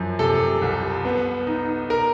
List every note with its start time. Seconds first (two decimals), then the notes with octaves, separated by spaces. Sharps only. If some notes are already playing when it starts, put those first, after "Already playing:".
Already playing: F#2 F3
0.19 C3 A4
0.62 C2
1.05 B3
1.47 D#4
1.90 A#4